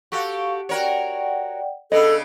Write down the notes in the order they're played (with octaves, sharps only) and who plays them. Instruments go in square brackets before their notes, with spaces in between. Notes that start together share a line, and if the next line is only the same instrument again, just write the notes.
[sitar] F#4 G4 A4 [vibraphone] F5 C#6
[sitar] F#4 A#4 C#5 [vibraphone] D5 F#5 G5
[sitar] C#3 B3 D4 [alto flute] A4 [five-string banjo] D#5